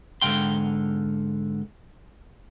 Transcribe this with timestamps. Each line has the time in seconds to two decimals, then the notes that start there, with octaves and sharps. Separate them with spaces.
0.21 G#2 D3 F#3 F5 G5 C6